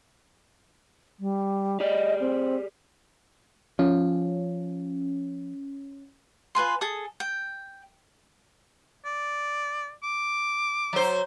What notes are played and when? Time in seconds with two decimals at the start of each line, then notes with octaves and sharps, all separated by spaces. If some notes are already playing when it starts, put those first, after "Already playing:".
1.19 G3
1.80 G4 G#4 D5 D#5
2.20 C4
3.79 F3 C#4
6.55 F4 B4 G#5 C6
6.81 G#4 A4 A5 D#6
7.20 G5
9.05 D5
10.03 D6
10.93 F#3 C5